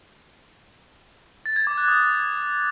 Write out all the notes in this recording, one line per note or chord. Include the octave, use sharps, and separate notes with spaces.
A6
G#6
D6
F#6
D#6